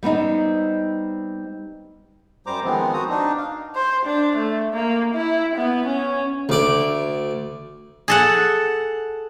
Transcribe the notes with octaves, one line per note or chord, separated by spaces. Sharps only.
G3 B3 C4 D#4
F#2 G3 C5 A#5 D6
D#3 F3 G#3 B3 C4
F#4 C5 A#5 D#6
D4 D#4
F5
C5
D4
A3
A#3
E4
B3
C#4
D2 D5
G#4 A4 F#5